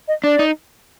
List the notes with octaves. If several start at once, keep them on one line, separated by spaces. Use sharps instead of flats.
D#5
D4 D5
D#4